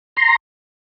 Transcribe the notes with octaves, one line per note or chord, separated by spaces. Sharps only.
A#5 C6